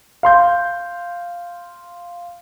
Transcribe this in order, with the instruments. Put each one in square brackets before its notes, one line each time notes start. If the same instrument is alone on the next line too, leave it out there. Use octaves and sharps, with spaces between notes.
[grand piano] F5 C6 G6